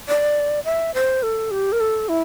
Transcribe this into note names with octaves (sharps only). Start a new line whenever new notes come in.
D5
E5
C5
A4
G4
A#4
A4
E4